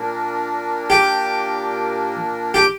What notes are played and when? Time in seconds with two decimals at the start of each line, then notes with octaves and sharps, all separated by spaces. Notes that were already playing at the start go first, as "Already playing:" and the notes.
Already playing: A#2 A#3 D4 A#4
0.90 G4
2.54 G4